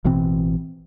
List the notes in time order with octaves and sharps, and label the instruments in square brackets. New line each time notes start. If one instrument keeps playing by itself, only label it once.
[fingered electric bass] A1 B2 E3 C4